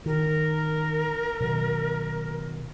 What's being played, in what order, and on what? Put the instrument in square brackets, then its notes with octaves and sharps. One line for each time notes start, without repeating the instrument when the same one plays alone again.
[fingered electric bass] D#3 [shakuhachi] A#4
[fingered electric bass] B2 D#3 F#3